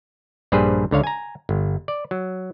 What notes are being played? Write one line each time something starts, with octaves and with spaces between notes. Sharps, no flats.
A#1 G2 G3 G#4 B4 C5
C#2 D3 C#5 F5
G#5 A#5
G1
D5
F#3